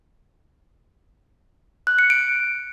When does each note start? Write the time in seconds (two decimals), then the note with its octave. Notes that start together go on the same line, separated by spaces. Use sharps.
1.87 F#6
1.99 C#7
2.10 D7